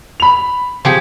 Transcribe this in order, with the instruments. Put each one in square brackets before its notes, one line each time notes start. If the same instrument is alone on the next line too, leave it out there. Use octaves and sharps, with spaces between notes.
[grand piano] B5 F7
[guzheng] F3 G4 G#4